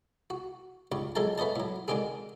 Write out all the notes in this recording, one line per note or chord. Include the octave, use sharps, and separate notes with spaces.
F#4
C#2 G2 C#6
F2 F#3 G#3 A4 G5 A5
A3 B3 C#4 D#5 A5
A2 F#3
D3 D#3 G#3 C4 G4 G#4